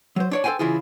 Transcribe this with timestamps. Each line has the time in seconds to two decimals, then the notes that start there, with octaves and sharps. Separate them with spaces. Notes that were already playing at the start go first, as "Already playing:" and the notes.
0.16 F#3 C5
0.31 D4 C#5 D5
0.44 A4 C5 F5 G5 G#5
0.59 C#3 E3 E4 F4 G#4